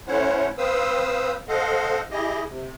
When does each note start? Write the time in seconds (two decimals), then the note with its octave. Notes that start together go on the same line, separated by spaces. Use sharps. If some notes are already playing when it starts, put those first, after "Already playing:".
0.07 A3 C#4 E4 C5 C#5 F#5
0.58 C4 B4 C5 F5 D#6 E6
1.48 A4 C5 D#5 F5 F#5
2.11 E4 G4 G#4 D#5
2.48 C3